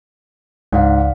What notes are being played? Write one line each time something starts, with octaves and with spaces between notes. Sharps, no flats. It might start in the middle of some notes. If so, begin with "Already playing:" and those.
C#2 G#2 D5 F5 F#5